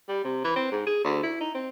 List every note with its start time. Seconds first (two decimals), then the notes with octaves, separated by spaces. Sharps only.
0.08 G3
0.24 C3
0.44 E3
0.56 C4
0.72 G#2
0.87 G#4
1.04 D2
1.23 E4
1.41 D#4
1.55 C4